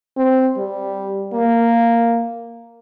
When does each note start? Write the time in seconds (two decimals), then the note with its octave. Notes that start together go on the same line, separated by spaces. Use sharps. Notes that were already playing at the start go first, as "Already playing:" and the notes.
0.17 C4
0.58 G3
1.33 A#3